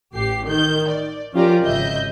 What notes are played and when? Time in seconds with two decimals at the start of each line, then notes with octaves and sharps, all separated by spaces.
0.14 A1 G4 C7
0.47 D#3 G6
0.89 D5
1.33 F3 C#4 F4 G4 A#4 D5
1.63 G#1 C#3 D#5 E5 G6